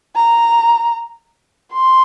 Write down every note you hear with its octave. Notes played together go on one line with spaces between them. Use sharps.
A#5
C6